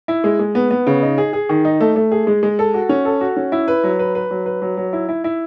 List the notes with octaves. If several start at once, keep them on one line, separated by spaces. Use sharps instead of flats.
E4
G#3
G#3
B3
B3
C#3
D#4
G#4
G#4
D#3
D#4
A3
A3
G#4
G#3
G#3
A4
F#4
C#4
A4
F#4
C#4
E4
B4
F#3
B4
B4
F#3
B4
F#3
F#3
E4
E4
E4